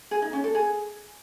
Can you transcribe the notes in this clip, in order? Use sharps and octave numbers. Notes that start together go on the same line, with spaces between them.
G#4
D#4
C#4
A4
G#4